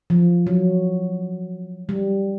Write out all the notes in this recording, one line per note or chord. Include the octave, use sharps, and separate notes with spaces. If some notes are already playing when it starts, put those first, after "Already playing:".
F3
F#3
G3